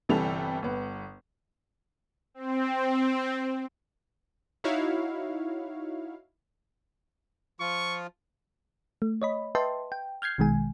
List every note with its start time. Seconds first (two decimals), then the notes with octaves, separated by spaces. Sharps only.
0.09 G1 C3 E3 G3 A4 F7
0.63 G1 B3
2.34 C4
4.64 D#4 E4 F#4 C#5 F5
7.60 F3 F4 C#6
9.02 A3
9.22 C#5 D#5 B5
9.55 B4 D#5 E5 G5 A5 C6
9.92 G5
10.22 F6 G6 G#6 C7
10.38 A#1 B2 D#3 G#3 G#5